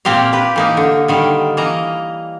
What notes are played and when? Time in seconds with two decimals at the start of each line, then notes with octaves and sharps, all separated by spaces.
0.05 A#2 A#3 C4 G4 F5
0.33 G4 B4
0.56 E3 A#3 D#4
0.77 D3
1.08 D3 D#3 G3
1.57 E3 A#3 D#5 A#5